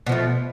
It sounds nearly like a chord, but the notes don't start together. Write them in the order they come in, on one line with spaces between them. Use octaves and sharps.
B2 F3 A3